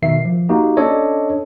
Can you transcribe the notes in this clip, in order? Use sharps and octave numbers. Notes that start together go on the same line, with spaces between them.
B2 D#3 E5 C7
F3
A#3 D#4 F#4 G4
C#4 D4 A4 C#5 D#5